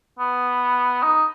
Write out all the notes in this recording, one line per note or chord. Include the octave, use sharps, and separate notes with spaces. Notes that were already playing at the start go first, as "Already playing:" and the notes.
B3
D#4